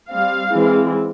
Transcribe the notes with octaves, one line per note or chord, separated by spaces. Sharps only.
G3 C4 F5
E3 G#3 C4